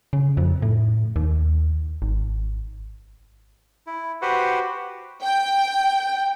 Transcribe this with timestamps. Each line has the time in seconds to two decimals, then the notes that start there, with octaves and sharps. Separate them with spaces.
0.13 C#3
0.37 F2
0.62 A2
1.16 D#2
2.02 G#1
3.87 E4
4.22 F#4 G4 B4 C5 F#5
5.23 G5